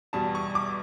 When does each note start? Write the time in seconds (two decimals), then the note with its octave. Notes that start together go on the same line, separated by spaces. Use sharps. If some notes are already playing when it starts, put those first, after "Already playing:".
0.13 E2 B2 G3 A5
0.35 C#6
0.55 D6